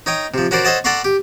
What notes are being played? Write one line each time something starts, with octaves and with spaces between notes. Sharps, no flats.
D#4 C#5 G5 D#6
C3 F3
C#4 F#4 A#4 C5 D5
A4 C5 C#5 D#5 F#5 A5
A4 D5 F#5 A#5 C6 C#6
G4